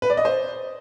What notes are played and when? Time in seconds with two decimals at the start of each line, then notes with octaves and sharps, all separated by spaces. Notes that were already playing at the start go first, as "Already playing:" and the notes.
0.02 B4
0.10 D5
0.17 D#5
0.25 C5